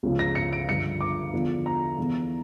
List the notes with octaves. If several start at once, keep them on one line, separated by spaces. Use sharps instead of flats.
C#2 C#3 F3
A#6
C#7
D7
G2 D3 F3 C#7
D6
E2 D3 F3
A#5
E2 E3